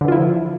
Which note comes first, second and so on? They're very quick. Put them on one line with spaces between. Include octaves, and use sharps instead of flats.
D3 E3 F4 E4 F3